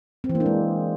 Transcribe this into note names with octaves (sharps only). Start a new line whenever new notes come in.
C4
E3
A#3
D4
G#3